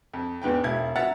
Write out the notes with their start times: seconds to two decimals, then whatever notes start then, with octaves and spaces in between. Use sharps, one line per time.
0.13 F2
0.42 E2 G#2 B4 G5
0.63 E1 E4 G#6
0.96 E5 F#5 A#5 A6